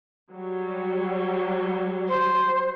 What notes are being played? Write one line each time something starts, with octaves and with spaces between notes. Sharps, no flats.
F#3 G3
C5